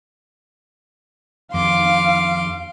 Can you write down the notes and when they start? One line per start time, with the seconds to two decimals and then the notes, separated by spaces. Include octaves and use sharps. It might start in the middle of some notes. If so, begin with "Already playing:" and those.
1.54 F2 D#3 F5 C6 D6